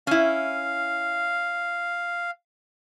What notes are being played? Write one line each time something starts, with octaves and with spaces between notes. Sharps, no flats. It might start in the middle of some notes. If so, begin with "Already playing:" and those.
C#4 E4 F5